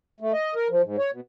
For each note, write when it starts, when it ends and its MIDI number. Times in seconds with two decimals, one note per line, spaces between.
0.20 0.32 57
0.33 0.54 75
0.55 0.68 70
0.70 0.82 53
0.83 0.97 44
0.98 1.11 73
1.11 1.20 47